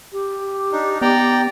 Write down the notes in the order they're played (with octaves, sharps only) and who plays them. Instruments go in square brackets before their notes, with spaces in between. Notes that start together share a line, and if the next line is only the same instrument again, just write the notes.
[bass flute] G4
[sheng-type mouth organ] D4 D#4
[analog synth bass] B3 [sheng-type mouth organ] D5 G5 A#5